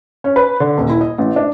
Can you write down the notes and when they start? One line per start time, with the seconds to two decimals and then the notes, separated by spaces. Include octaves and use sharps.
0.24 C#4
0.36 B4
0.60 D3
0.78 D#1
0.89 E4
1.01 D#5
1.18 A1
1.36 D4